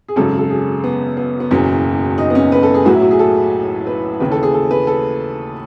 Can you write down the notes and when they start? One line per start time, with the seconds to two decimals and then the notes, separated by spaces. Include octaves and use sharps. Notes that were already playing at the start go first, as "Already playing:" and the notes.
0.09 G#4
0.16 G#1 F#2 C#3 A4
0.38 A4
0.50 G#4
0.84 B3
1.17 B3
1.40 B3
1.51 F#1 E2 B2 F#3 C#4
2.18 D#4
2.30 B3
2.35 C#4
2.52 B4
2.63 A4
2.74 G#4
2.85 B1 A2 F#3 F#4
2.93 E4
3.02 F#4
3.11 G#4
3.19 A4
3.87 B4
4.20 D#2 C#3 E3 B4
4.32 A4
4.43 G#4
4.54 A4
4.71 B4
4.87 A4